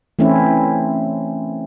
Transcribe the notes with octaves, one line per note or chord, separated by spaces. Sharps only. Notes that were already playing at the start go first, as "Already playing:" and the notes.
E3 A3 C4 C#4 E4